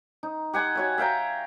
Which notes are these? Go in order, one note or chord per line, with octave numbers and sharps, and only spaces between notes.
D#4
G4 F#5 G#5 C6
F#4 C#5 E5
E5 F5 G5 A#5